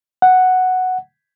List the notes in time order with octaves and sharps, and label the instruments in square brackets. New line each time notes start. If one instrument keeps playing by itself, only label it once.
[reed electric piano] F#5